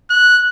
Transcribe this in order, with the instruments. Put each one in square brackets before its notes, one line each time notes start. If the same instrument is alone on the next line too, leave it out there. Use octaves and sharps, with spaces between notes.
[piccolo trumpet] F#6